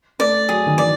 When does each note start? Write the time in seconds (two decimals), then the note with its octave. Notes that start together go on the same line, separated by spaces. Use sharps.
0.19 A3 D5
0.49 F#3 G#4
0.66 D#3
0.78 E3 D5